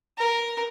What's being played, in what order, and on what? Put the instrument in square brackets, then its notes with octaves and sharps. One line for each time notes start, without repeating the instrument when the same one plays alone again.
[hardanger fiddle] A#4